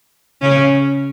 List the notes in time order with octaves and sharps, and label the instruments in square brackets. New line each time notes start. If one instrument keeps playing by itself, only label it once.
[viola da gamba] C#3 C#4